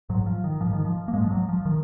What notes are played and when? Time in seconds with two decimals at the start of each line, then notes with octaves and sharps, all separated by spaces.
0.10 G#2 F#3
0.26 F3
0.44 D#3
0.61 G#2 F3
0.73 D#3
0.85 F3
1.08 A#3
1.13 G#2 G#3
1.24 F3
1.31 F#3
1.49 F3
1.65 D#3